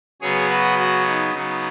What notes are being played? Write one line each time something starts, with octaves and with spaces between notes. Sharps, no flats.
C#3 F#3 B3 G#4 C#5
F#4 B4
F#4
D#4
C#3 F#3 B3 D#4